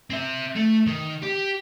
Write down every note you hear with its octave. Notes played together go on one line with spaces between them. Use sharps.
C4 E5
A3
D#3
G4